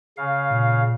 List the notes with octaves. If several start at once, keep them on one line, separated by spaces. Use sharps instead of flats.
C#3 F5
A#2